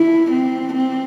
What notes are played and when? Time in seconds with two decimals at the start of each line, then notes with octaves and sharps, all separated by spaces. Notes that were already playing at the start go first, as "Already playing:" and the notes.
Already playing: E4
0.32 C4
0.74 C4